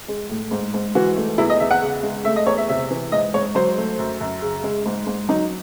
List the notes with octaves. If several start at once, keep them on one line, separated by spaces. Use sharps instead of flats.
G#3
A2
G#2
G#2
E3 F#4
A3
E2 E4
D#5
E2 E5
F#5
C#3
G#3
A3 E5
D#5
E2 C#5
E5
C3 E5
E3
G#2 D#5
G#2 C#5
F#3 C5
A3
F#2
F#2
C#3
G#3
G#2
G#2
F#3 D#4